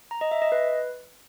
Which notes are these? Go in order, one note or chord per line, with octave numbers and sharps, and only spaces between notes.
A#5
D#5
E5
D#5
B4